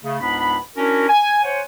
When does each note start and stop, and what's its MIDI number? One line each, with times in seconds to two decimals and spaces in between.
0.03 0.17 49
0.03 0.17 57
0.20 0.56 37
0.20 0.56 44
0.20 0.56 59
0.20 0.56 62
0.20 0.56 83
0.76 1.06 61
0.76 1.06 62
0.76 1.06 64
0.76 1.06 66
0.76 1.06 70
1.08 1.40 80
1.43 1.60 72
1.43 1.60 73
1.43 1.60 78
1.43 1.60 80